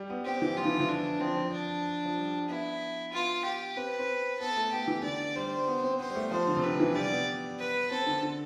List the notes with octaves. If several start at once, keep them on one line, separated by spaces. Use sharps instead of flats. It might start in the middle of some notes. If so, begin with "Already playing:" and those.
Already playing: G3
B3
C4 G4
E3
F3 F4
E3
D3
E3
D4
F3 C4
F3
D4
F3
G3
B3 E4
B3 F4
G4
C4 B4
C4
B3 A4
A3
B3 G4
E3
D3 D5
G3 C5
B3
C4
B3 C5
G3
A3
F3 C5
D3
C3
D3 B4
E3
G3 D5
B3
B4
C4 A4
D3
D3